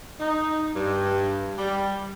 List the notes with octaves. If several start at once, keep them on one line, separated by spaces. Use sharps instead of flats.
D#4
G2
G3